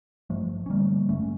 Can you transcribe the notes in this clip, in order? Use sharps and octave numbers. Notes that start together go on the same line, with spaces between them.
G2 F3 A3
C#4
D3 G3 A#3
G2 A3 C#4